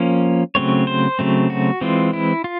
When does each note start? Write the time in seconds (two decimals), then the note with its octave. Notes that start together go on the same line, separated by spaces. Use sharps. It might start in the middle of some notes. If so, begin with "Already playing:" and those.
Already playing: F3 A#3 C#4
0.55 C#3 F#3 A3 C4 C#5
0.87 C5
1.19 C#3 F#3 A3 C4
1.50 F#4
1.81 E3 G#3 C4 F4
2.13 E4
2.44 F4